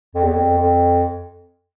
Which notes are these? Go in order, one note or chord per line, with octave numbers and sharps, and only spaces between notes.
F2
E2
F2
F2